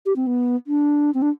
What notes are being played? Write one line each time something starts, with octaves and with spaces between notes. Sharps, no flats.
G4
C4
B3
D4
C4
D4